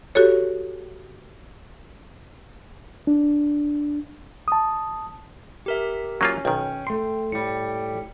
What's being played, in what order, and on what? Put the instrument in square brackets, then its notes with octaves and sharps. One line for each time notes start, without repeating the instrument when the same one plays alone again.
[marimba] F#4 G4 A4 C#5
[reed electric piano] D4
A5 D#6
[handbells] G4 A#4 E5
[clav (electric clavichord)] F#3 A#3 F4 [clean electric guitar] C#4
[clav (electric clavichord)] B1 D#3 [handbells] G5
[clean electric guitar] A3 C6
[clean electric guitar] A2 G3 [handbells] C#7